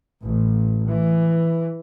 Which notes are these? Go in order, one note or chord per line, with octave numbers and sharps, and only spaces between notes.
A1
E3